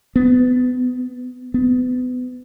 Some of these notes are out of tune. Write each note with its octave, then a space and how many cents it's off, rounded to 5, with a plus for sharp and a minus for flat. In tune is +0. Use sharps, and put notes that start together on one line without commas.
B3 +25
B3 +30